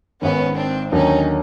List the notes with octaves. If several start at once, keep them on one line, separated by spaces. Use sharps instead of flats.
G#1 G#2 D#3 B3 C#4
C4 D4
D#2 D3 F#3 C#4 D#4